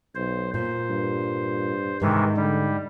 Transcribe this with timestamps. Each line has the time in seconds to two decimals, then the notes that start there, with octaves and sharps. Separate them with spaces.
0.15 B1 C5
0.54 A#2 C5
0.89 G2
2.02 G#2 C3 D#3 E3
2.37 D3 G3